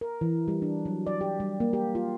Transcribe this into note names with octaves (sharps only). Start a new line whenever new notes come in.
A#4
E3
G3
D4
F#3
D5
G4
G3
A#3
G4
F4